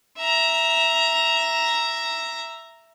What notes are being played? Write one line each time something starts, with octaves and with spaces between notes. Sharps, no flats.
E5 A#5